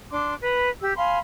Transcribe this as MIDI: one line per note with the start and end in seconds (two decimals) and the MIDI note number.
0.11 0.35 62
0.11 0.35 84
0.11 0.35 86
0.42 0.69 71
0.42 0.69 82
0.42 0.69 83
0.81 0.93 67
0.81 0.93 88
0.97 1.19 77
0.97 1.19 80
0.97 1.19 83
0.97 1.19 84